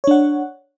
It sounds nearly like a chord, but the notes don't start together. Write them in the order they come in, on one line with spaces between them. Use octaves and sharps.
C#5 D4 F#5